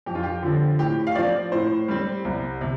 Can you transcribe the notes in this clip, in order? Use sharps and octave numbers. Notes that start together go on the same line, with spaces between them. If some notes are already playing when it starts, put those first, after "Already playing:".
F2 G4
F4
G4
D3 F3 C4
A2 G4
F5
F3 C4 D5
A2 C5
G3 C4
C2
C3